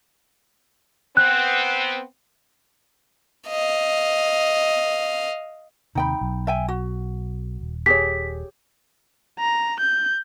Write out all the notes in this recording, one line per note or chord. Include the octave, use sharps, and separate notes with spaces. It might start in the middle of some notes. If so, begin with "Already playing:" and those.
B3 C4 F#6
D#5 F5
D#2 C3 D#4 G5 B5
B1
E5 G5 G#5
F#4
D#1
G4 G#4 C#5 B6
A#5
G6